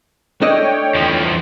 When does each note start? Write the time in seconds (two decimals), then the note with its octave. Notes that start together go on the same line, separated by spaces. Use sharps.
0.42 A3 D4 C#5 D#5 G5
0.95 E2 F3